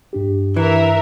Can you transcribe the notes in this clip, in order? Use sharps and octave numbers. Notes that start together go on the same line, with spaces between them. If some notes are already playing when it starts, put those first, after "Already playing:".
G2 D4 G4
E3 A#4 E5